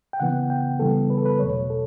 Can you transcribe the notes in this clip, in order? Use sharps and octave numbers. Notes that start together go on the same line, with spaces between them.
G5
C#3 E3 B3 F#5
G5
C#3 E3 G3 B3 A4
B4
A4
B4
E2 B2 F#3 A3 C#5
A4